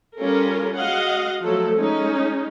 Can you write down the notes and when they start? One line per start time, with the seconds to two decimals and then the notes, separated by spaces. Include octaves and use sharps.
0.17 G3 C#4 F4 A4 A#4
0.76 G#3 F#4 D#5 F5 F#5
1.42 F3 F#3 A3 A4
1.75 G#3 C#4 D#4